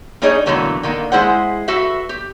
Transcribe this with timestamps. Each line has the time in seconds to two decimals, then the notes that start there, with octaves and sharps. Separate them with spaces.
0.22 G3 D4 D#4 G#4 C#5 D#5
0.46 B2 D3 E3 F#3 A3 A#3
0.83 D3 D#3 A#3
1.12 G#3 E4 G#4 C5 F#5
1.68 F#4 A4 B4 E5
2.09 G4